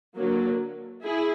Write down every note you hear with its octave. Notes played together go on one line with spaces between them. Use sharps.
D3 F#3 A#3
E4 G#4